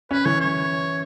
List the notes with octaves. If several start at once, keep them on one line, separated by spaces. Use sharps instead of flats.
C#4 B4
E3 C#5
C#5